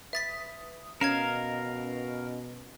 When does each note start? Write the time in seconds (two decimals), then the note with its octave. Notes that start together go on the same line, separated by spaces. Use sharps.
0.13 B4 E5 D#6 A6 B6
1.01 B2 C#4 A#4 D#5 F5 G#6 C7 E7